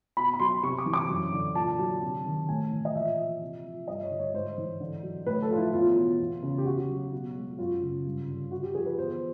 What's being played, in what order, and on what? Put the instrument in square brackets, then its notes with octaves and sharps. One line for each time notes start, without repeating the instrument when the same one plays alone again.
[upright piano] B2 B5
B5
F#3 C6
C3 C#6
D6
E3
D6
F#2
D3
A#2 A5
F#3
C3
D#3
A2 G#5
E3
D#5
A#2 E5
F3
C3
F3
G2 D#5
C#5
D3
C#5
G#2 C5
E3
D3
F#3
A2 B4
A4
F3 F4
E4
E2 F4
B2
E2
C#3
G4
C#3 F#4
F#3
B2
G#3
F#2 F4
C#3
G2
D3
D3 F#4
G4
F3 G#4
B4
E2 C5